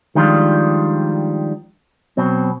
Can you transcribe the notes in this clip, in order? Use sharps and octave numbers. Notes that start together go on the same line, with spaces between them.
D#3 F3 G3 G#3 D4 F4
B2 F#3 C4